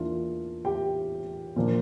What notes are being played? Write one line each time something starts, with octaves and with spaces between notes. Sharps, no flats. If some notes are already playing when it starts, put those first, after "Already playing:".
Already playing: E2 E3 A#3 D4 F4
G4 G5
A#2 F3 A#3 D4